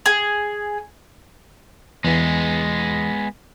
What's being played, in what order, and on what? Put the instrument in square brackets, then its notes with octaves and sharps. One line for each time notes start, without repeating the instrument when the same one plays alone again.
[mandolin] G#4
[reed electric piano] E2 E3 [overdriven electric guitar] G#3 B3